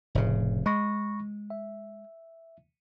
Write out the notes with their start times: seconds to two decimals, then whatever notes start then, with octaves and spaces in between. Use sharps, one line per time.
0.15 F1 A2 C#3
0.66 G#3 B5 C#6 A#6
1.50 E5